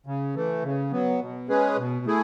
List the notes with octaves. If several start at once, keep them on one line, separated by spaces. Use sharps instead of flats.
C#3
E3 A3
C#3
F#3 B3
B2
G#3 C#4 G#4 B4
B2
A3 E4 G#4